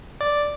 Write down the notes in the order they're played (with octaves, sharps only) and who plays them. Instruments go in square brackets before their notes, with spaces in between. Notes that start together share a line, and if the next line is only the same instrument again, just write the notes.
[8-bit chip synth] D5